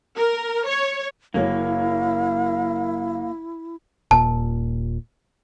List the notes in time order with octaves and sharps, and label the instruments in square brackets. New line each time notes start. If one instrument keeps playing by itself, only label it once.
[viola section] A#4
C#5
[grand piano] F#1 F#3 C#5 [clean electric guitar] A#3 [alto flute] E4 [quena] F5
[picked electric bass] D#1 A#2 [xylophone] A5